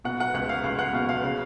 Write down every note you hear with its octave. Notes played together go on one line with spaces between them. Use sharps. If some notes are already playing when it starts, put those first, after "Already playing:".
B2 F#5
F#5
C#2 F#5
F5
C#2 F5
F#5
B2 F5
F5
C#3